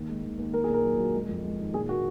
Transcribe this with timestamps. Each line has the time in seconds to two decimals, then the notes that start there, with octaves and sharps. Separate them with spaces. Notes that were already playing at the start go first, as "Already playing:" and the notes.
Already playing: D#2
0.09 G#3
0.24 D#2
0.39 D#2
0.53 A#3 A#4
0.64 A#2 G#4
0.74 A#4
0.84 F#3
0.98 F#3
1.14 G#3
1.28 F2
1.44 G#3
1.59 D#3
1.73 A#2 G#4
1.89 A#3 F#4